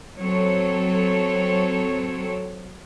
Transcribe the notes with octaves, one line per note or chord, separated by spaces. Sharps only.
F#3 C4 A4 C#5